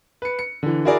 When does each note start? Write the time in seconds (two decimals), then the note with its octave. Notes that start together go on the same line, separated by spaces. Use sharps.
0.22 B4 C#7
0.39 C#7
0.63 D3 E3
0.85 E4 F#4 G#4 A#4 D5